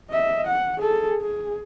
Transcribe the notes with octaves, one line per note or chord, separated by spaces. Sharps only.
D#5 E5
F#5
G#4 A4
G#4